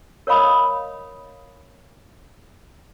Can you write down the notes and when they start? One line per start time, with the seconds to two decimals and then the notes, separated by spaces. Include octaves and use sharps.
0.27 A#4 C#5 D#5 F5 B5 D#6